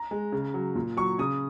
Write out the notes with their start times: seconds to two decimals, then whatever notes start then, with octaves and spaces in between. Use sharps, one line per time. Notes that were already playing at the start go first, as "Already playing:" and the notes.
Already playing: A#5
0.11 G#3
0.32 C#3
0.54 F#3
0.75 A#2
0.97 F#3 C#6
1.19 C#3 D#6